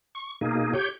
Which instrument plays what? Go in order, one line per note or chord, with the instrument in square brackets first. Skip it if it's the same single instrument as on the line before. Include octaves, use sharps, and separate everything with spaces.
[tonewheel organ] C#6
B2 A#3 D#4 G#4
G4 C#5 G6